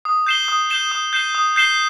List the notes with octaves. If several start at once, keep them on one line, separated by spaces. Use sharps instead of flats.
D#6
G6 C7 E7 G7
D#6
G6 C7 E7 G7
D#6
G6 C7 E7 G7
D#6
G6 C7 E7 G7